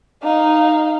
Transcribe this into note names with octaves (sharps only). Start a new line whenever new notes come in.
D#4 F5